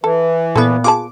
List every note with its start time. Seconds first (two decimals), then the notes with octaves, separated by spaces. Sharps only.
0.04 E3 A4
0.56 A#2 B3 E4 A4
0.84 F4 G#4 A5 D6